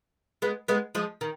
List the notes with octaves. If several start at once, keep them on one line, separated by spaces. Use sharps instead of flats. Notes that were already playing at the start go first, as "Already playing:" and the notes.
G#3 B3
G#3 B3
F3 G#3
D#3